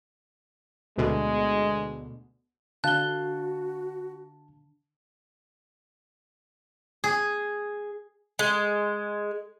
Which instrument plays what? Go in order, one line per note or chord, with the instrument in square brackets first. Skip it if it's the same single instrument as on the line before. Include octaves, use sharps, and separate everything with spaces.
[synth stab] D2 B2 D3 [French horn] G#3
[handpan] D3 D4 F5 [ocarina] F#4 [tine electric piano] A5 [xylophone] F#6 G7
[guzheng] G#4
[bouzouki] G#3